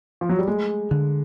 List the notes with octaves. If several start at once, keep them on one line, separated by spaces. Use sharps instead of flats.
F3
F#3
G3
G#3 A3
D3